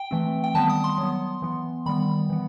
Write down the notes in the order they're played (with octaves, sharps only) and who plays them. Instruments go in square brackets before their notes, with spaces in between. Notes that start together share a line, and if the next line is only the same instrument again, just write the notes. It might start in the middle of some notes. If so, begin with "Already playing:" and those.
Already playing: [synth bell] G5
E3 A3 C4
G5
D#3 G3 B3 A5
D#6
C6
F#3
B3
E3 B3
D#3 G3 B3 B5
E3 B3